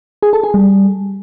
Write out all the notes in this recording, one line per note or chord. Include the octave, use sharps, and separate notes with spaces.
G#4
A4
G#4
G3